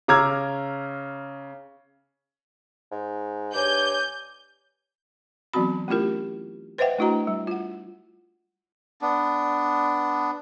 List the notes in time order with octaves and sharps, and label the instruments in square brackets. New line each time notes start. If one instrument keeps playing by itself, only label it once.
[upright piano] C#3 A#5 D6 E6 F6 G#6
[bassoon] G#2
[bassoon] G2 [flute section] C#5 G#5 D6 [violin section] G6
[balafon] E3 F#3 B3 C4 F#4 B5
A3 C#4 E4 F4 G4 A#4
B4 C5 D#5 E5 F#5 G5
A3 D4 E4 F#4 D#5 A#5
G3
F4 F#5
[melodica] B3 D4